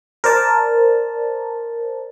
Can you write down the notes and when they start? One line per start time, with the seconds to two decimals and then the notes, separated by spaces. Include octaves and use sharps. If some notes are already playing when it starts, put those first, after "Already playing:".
0.24 A#4 C5 D5 A5